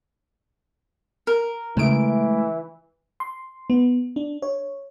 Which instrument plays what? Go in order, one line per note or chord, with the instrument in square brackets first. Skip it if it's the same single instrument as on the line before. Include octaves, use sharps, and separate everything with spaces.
[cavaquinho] A#4
[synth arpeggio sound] C#3 D7 [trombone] E3 [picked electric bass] G#3 A3
[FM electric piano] C6
B3
D4
C#5